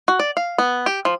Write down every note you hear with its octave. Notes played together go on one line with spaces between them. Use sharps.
F#4
D5
F5
B3
G4
F3